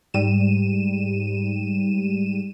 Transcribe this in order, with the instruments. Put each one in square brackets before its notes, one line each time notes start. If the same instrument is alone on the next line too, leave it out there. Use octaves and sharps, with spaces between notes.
[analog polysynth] G#2 G3 D#7 E7